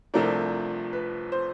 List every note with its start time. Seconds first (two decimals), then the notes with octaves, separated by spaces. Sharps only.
0.14 C2 C3 F3 A3 D4 A#4
0.93 B4
1.32 C5